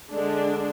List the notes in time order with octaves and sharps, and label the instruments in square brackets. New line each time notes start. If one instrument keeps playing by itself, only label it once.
[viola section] D3 G#3 D4